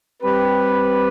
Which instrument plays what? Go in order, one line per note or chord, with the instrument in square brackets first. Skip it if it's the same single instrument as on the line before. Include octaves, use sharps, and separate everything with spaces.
[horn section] G3 C4 G4 B4